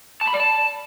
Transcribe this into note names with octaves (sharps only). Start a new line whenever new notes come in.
A5
B5
D5
A5